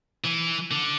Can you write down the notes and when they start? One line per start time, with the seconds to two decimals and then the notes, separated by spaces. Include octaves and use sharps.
0.24 E3
0.71 D3